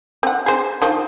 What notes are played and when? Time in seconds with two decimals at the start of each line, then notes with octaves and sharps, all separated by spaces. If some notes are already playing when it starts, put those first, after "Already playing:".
0.23 C4 F#5
0.46 G#4 C5
0.82 D#3 F3